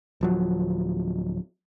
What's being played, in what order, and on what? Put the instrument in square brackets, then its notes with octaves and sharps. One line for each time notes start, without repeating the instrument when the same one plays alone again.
[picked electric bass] D1 F3 F#3